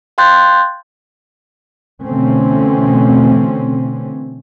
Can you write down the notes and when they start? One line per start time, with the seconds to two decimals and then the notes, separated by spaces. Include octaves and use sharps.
0.18 F5 G5 C6 F#6 G6 A6
2.04 B2 D3 E3 A3 C4 C#4